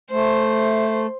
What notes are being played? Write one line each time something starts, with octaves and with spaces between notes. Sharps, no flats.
A3 C5